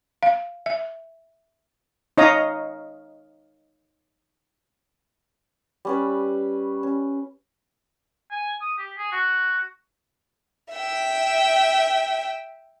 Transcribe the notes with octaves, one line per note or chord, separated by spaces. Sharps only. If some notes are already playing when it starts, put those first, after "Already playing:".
F5
E5
D#4 C#5 D#5 F5 A#5 D#6
G3 C#4 B4
C#4
G#5
D#6
G4
G#4
F#4
E5 G5